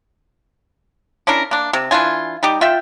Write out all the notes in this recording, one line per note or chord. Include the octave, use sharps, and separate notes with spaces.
C#4 D4 E4 A#4
A#3 D4
C3
E3 D4 F4 G#5
G3 D#4 G4
F4 E5 G5